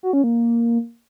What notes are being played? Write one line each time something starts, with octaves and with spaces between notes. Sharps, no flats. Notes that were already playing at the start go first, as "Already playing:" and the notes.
F#4
C#4
A#3